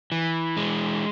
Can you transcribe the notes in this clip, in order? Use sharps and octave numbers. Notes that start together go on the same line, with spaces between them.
E3
G#3